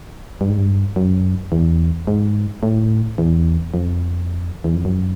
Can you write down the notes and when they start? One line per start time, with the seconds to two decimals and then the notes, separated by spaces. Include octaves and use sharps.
0.41 G2
0.49 G#2
0.58 G2
0.96 F#2
1.52 E2
2.07 G#2
2.63 A2
3.18 E2
3.74 F2
4.64 E2
4.75 F2
4.85 F#2